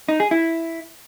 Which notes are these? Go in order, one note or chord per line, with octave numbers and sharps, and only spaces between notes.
D#4
G#4
E4